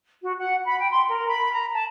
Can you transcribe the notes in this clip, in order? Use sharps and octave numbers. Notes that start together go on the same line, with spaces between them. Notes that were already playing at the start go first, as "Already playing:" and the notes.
F#4
F#5
B5
G5
C6
A#4
B5
A#5
A5